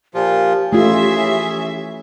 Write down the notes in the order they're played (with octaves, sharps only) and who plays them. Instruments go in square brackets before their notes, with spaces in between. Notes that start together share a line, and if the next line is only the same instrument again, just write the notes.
[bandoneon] A#2 F3 F4 [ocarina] G4
[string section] E3 C#4 E5 [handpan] A3 F4 [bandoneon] G#4